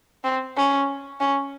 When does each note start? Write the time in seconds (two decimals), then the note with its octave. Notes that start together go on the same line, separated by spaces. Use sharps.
0.24 C4
0.57 C#4
1.20 C#4